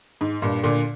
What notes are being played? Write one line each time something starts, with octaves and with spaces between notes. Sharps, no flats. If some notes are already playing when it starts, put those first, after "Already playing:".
G#2
G2 A#2
A#2 D3